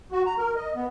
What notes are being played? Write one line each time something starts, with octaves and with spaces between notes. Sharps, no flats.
F#4
A#5
A#4
D#5
B3